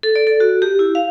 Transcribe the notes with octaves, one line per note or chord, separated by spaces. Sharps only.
A4
D5
A4
F#4
G4
E4
F5